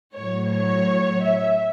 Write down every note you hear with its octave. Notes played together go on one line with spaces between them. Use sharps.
A2 F#3 C#5
C#5
E5